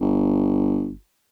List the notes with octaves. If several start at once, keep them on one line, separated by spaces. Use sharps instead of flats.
G1